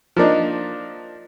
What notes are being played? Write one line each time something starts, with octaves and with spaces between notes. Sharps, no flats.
F3 A#3 D4 D#4